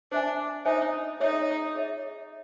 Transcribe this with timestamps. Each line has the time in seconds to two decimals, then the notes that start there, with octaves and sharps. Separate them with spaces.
0.11 D4 C5 E5 G#5
0.65 D#4 C5 E5 G#5
1.20 D#4 G#4 C#5 E5
1.75 G#4 C#5 E5